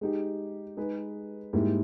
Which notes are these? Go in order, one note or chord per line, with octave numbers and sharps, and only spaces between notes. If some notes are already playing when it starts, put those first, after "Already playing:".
G#3 D#4 G4
G#3 D#4 G#4 B4
G#2 G3 A#3 E4 G4